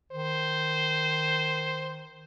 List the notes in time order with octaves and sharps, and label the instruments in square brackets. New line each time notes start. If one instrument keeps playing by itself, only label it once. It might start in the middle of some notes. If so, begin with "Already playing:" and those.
[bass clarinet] D#3 [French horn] C5